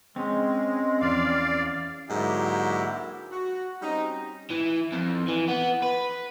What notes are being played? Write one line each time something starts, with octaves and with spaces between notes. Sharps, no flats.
G#3 C4 C#4
E2 D5 F5
G#2 D3 F#3 A#3 E4 G4
F#4
G3 C4 C#4 D#4
E3
F2
E3
B3
B4